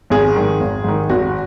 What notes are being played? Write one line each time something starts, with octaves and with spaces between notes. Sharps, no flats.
G#1 G#4
G#2 D#3
G#1
G#2 D#3
G#1 F#4